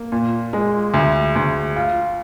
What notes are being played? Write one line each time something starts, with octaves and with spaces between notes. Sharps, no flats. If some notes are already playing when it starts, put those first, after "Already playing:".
Already playing: A#3
A#2
G#3
D2
D2
F4